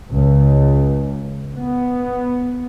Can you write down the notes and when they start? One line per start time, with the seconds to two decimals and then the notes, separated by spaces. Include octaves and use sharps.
0.12 C#2
1.56 B3